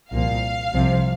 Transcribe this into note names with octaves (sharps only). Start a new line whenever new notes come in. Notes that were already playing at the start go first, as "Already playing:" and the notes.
C2 A#2 F3 F5
C2 C3 F3